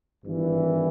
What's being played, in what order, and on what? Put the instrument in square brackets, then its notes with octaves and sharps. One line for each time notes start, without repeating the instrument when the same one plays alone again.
[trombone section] G#1 G2 E3